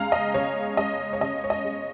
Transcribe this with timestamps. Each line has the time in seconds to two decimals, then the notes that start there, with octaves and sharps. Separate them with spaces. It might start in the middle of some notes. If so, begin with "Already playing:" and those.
Already playing: C#3 G#3 F5 A#5
0.12 D#5
0.34 C#3 C#5
0.77 G#3 D#5
1.13 C#5
1.21 C#3 D#5
1.44 C#5
1.50 D#5
1.65 G#3